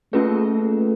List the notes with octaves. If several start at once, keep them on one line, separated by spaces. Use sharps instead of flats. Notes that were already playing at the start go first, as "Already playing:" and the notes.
A3 A#3 C#4 F4 G#4 B4